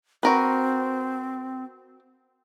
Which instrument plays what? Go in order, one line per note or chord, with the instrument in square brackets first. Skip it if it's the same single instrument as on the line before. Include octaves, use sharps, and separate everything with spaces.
[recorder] C4 [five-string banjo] F#4 A#4 B4